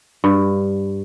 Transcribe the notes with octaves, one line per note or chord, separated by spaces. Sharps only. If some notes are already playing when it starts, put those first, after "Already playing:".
G2